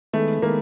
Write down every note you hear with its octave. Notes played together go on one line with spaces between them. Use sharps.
D#3 G#3 A3 B3
D#3 G#3 A#3 B3